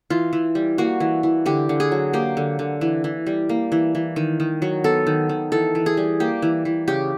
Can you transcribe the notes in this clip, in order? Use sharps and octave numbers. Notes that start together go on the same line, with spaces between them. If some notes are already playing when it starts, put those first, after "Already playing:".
E3 F4
E3
G3
A#3 F#4
E3
E3
D3 G4
D3
G#4
F#3
A#3 G4
D3
D3
E3
E3
G3
A#3
E3
E3
D#3
D#3
F#3
B3 A4
D#3
D#3
E3 A4
E3
G#4
G3
A#3 G4
E3
E3
C#3 G4